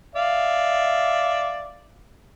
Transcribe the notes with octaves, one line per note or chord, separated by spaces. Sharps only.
D5 E5 F5